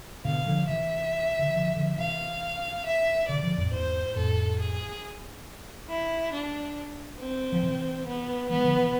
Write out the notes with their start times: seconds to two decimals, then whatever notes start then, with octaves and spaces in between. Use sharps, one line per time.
0.25 B2 D3 F5
0.46 D3 F3
0.69 C3 E3 E5
1.39 D3
1.47 E3
1.55 D3 F3
1.76 D3 F3
1.98 C3 E3 F5
2.86 E5
3.28 B2 D3 D5
3.43 D3 F3
3.58 F2 A2
3.72 E2 G#2 C5
4.16 F2 A2 A4
4.59 G#4
5.89 E4
6.33 D4
7.20 C4
7.52 F3
7.63 C3 E3
8.07 B3
8.50 E3 G#3 B3
8.64 D3 F3
8.79 C3 E3